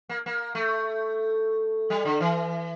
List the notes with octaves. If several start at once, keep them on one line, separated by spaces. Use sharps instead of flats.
A#3
A#3
A3
G3
D3
E3